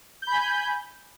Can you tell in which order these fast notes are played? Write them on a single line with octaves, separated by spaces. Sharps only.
G6 B5 G#5